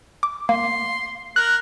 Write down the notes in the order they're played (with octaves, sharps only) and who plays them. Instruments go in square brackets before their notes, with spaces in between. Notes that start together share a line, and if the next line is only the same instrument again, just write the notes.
[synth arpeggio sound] D6
[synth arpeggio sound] A#3 [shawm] C6
[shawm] A#4 [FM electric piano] F#6